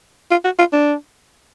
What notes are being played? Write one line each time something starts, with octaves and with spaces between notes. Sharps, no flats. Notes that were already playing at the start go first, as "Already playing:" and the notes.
F4
F#4
F4
D4